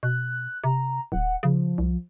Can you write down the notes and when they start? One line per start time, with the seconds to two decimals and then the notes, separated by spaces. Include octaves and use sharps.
0.03 B2 F#6
0.64 C3 A#5
1.12 D1 F#5
1.43 C#3 F3
1.78 C2